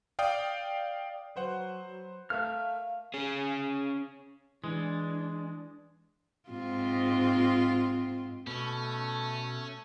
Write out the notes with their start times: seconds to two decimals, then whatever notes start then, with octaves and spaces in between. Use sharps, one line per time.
0.19 D5 F5 G5 D#6
1.36 F#3 B4 C5 F#5
2.30 A3 A#4 E5 F5 F6
3.14 C#4 G#4
4.64 E3 G#3 D4
6.49 G#2 C4 F4
8.47 B2 A3 C#4